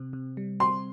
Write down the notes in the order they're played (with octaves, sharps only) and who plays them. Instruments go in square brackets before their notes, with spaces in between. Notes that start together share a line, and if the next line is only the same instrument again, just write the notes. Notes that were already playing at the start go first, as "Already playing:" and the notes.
Already playing: [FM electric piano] C3 C4
C3
G3
[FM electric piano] C4 [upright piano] C6